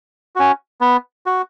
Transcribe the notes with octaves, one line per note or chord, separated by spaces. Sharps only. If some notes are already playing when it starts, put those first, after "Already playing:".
C#4 F#4
B3
F#4